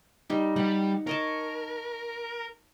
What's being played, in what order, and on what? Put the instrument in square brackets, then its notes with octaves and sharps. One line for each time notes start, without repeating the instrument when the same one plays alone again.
[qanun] G3 D#4
[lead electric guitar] G3 [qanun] F#5
[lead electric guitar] A#4 [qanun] C#5 D#5 A5